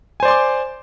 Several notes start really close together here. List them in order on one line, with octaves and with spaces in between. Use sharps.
G#5 C5 D5 C6 D6